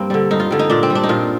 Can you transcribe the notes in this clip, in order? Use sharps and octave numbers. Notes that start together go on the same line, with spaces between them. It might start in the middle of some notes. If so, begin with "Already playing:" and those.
Already playing: G2 A#3 C4
D3 G3
G2 D#4
F4
D3 G3
D#4
A#2 D4
C4
G3
D4
D#4
A#2 F4